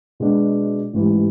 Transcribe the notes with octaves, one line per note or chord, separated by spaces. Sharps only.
B2 G#3 B3 D4
A1 G#2 E3 G3